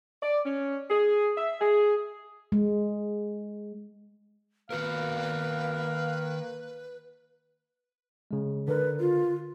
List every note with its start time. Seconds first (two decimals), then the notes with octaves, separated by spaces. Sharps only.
0.22 D5
0.45 C#4
0.90 G#4
1.36 E5
1.60 G#4
2.52 G#3
4.70 D#3 A#3 F#4 A#4 B4 F5
8.31 C#3 G#3
8.68 D3 A#4 B4
9.00 F4